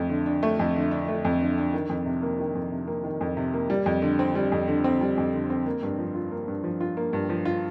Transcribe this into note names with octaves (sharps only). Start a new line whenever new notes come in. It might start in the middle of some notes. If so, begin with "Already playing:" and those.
Already playing: F2 A3
D3
D4
A3
F2
D3
D4
A3
F2
D3
D4
D#3
F2
C3
A#3
D#3
F2
C3
A#3
D#3
F2
C3
A#3
G3
F2
D3
C4
G3
F2
D3
C4
G3
F2
D3
C4
A#3
G2
F3
F4
A#3
G2
F3
F4
A#3
G2
F3
F4